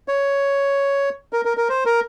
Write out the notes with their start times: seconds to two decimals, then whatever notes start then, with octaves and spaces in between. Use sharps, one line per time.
0.08 C#5
1.33 A#4
1.45 A#4
1.57 A#4
1.69 C5
1.86 A#4